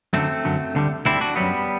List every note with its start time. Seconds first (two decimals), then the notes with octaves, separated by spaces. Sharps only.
0.13 F#2 D3 F#3 A3 C4
0.45 F#2 D3 F#3
0.75 D2 D3 G3
1.05 D2 D3 G3 C4 E4
1.21 D4 F#4
1.36 F#2 F#3 G3 B3